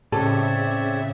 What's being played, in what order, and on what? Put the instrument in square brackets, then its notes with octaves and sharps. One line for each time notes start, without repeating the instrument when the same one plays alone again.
[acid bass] A2 [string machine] C#3 E5 [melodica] C4 C#5 D5 [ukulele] A4